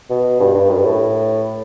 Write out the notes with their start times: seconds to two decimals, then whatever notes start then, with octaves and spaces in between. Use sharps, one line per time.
0.10 B2
0.40 G2
0.55 G2
0.70 F#2
0.77 G2
0.85 A2